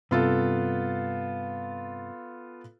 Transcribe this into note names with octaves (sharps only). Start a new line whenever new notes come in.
G2 C3 B3 F4 A4